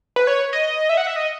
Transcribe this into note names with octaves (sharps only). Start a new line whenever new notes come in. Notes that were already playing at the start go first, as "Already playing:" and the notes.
B4
C#5
D#5
E5
F#5
E5
D#5